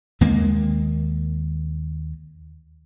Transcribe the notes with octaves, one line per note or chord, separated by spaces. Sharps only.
D#2 D#3 G#3 A#3